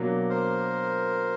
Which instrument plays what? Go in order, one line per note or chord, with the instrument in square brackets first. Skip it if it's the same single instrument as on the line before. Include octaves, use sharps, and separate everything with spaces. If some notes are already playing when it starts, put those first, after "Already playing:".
Already playing: [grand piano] B2 F#3 A#3 D4
[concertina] A#4 C5